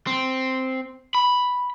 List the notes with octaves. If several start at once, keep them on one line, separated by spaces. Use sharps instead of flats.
C4
B5